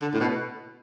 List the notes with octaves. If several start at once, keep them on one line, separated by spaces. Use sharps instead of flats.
D3
A2
B2